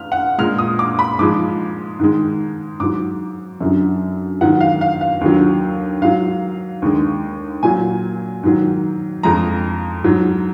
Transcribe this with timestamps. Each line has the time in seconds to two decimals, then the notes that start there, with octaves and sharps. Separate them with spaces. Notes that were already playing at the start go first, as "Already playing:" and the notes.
Already playing: F6
0.12 F#5
0.38 A#2 G#3 F6
0.58 D#6
0.79 D6
0.99 B5
1.19 G#2 F3 G#3 D6
1.99 G#2 D#3 G#3
2.80 G#2 F#3 D6
3.61 F#2 D3 F#3
4.41 G#2 D#3 F#3 F#5
4.61 F5
4.81 F5
5.01 F5
5.21 D#2 D3 F#3
6.01 G#2 F#3 F5
6.82 D#2 D3 G#3
7.63 A#2 F#3 G#5
8.43 G#2 D#3 F#3
9.23 F2 F3 G#3 A#5
10.04 G#2 F#3